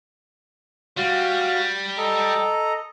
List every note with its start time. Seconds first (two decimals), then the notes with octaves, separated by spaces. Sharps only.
0.97 G3 F#4 F5
1.98 A4 D#5 A#5